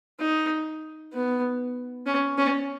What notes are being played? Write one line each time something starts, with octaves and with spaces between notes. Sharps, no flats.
D#4
B3
C#4
C#4